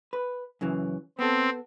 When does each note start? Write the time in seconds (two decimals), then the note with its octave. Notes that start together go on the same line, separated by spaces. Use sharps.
0.13 B4
0.61 F#2 C#3 E3
1.19 B3 C4 A4